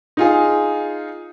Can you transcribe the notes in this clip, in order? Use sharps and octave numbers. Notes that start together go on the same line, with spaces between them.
D#4 F4 G#4